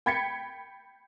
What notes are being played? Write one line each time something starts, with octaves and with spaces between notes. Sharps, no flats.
G5 B5 G#6 A6 B6 C#7